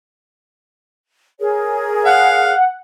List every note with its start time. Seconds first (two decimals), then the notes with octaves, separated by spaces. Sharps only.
1.39 G#4 A#4 C#5
2.05 F5 F#5